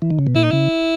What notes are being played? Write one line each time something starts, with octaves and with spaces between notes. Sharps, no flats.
E3
D#3
C#3
B2
A#2 E4
D#4
C#3 E4